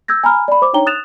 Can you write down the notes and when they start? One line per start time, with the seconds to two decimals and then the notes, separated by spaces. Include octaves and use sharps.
0.08 E6 G6 G#6 A#6
0.23 G#5 A#5 B5 F6
0.48 D5 B5
0.62 C5 D6
0.73 D4 D#4 C#5 G5 A#5 G7
0.86 D#6 F#6 A6 E7 F7